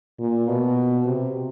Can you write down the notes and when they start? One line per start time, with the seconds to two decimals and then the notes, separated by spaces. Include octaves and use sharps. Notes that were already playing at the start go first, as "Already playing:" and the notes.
0.19 A#2
0.48 B2
1.06 C3